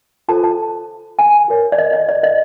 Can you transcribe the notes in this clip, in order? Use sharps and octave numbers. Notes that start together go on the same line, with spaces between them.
F4 A4 C5 A5
A5
G#5
F#4 A#4 C#5
D5
D#5
D5
D5
D#5